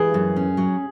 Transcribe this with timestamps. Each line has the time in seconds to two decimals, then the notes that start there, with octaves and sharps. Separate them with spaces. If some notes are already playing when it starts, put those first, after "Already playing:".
Already playing: E3 G#4
0.14 F#2
0.36 C#4
0.57 F#3